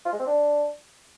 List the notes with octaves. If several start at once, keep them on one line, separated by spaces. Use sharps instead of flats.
F4
G#3
C4
D4